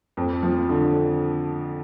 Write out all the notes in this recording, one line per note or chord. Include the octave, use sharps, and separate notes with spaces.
F2
F3
D3